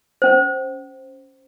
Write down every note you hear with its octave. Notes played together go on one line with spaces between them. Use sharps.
C#4 C5